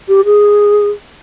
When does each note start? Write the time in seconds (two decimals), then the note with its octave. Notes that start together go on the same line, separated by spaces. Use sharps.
0.08 G4
0.25 G#4